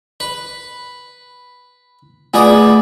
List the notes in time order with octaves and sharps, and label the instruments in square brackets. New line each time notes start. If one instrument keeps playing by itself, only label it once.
[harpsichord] B4
[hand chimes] A3 F4 G#5 [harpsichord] B3 G#4 D5